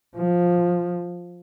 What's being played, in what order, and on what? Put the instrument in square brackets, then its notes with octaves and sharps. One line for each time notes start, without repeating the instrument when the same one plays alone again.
[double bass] F3